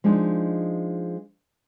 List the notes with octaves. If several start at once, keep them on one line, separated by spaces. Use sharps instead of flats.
F3 G#3 D4 D#4